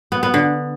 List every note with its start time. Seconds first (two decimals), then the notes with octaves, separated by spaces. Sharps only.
0.12 B3
0.23 B3
0.34 D3